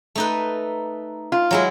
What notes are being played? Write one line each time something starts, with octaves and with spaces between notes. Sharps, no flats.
A3 D#4 B4
F4
F#3 G#3 E4